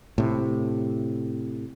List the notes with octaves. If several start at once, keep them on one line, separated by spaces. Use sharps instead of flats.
A2 C3